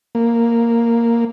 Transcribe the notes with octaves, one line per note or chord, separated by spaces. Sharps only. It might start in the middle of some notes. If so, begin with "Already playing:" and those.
A#3